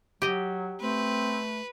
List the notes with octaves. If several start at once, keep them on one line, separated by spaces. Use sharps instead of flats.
F#3 G4 D#5
A3 C4 B4